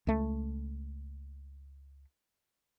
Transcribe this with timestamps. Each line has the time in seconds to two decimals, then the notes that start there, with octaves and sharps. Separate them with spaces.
0.07 C#2 A3